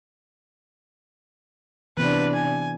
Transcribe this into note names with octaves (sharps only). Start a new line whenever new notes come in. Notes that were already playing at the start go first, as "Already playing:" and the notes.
C3 E3 B3 D4 B4
G#5